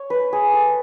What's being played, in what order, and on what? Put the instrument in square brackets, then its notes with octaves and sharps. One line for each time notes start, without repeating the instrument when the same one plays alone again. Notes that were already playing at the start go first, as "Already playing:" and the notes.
Already playing: [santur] C#5
B4
G#4
A4